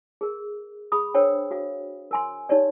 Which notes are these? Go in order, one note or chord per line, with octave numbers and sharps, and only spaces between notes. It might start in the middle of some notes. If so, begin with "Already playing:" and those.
G#4 A#4
G#4 B5 D#6
D4 A#4 C5 C#5 G5
F#4 F5
A#4 G#5 C6
D#4 G4 C#5 D5